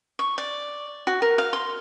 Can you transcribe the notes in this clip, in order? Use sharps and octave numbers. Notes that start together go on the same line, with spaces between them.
C#6
D5
F#4
A#4
F5
C6